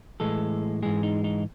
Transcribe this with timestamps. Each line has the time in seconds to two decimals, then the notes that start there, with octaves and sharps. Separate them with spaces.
0.20 A2 E3 G#3 A4
0.83 G#2 E3 G#3 G#4
1.03 D#4
1.24 D#4